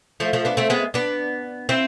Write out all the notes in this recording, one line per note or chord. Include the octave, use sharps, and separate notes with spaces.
F3 A3
F3 A3
B3 D4
A3 C4
G#3 B3
B3 D4
C4 E4